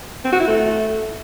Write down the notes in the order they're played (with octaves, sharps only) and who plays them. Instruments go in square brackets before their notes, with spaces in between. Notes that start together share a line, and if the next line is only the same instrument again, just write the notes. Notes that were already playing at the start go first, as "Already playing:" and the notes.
[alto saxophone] C4
F#4
E4
A3